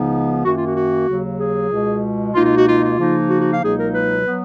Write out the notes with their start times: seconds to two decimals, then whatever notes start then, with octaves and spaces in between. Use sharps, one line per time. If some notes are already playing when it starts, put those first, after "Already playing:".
Already playing: C#2 C#3 F3 B3 D#4
0.44 F#2 D#3 A#3 F#4
0.54 F4
0.65 F#4
0.75 F#4
1.07 D#2 C#3 F#3
1.39 G#4
1.70 C#2 B2 G#3
2.33 C#2 B2 A#3 D#4 F4
2.44 F4
2.55 F#4
2.66 F4
2.81 F4
2.97 C#3 F3 A#3 D#4
3.29 F#4
3.39 F#4
3.50 F5
3.60 C#2 B2 F#3 A#3 D#4 G#4
3.77 A#4
3.92 B4
4.26 F#3 B3